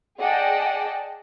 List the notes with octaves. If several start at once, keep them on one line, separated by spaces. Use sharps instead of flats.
G#4 D5 D#5 F#5 G5 A5